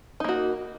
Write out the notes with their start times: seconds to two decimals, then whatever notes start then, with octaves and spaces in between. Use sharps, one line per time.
0.20 D#4
0.24 A#3
0.29 F#4